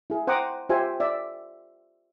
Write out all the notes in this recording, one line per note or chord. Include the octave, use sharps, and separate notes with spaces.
E4 G#4
C5 F#5 G5 A#5 D6 D#6
F4 G4 C5 E5 G#5
D5 E5